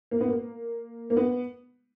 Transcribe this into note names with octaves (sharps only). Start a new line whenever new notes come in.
A#3
B3
A#3
A#3
B3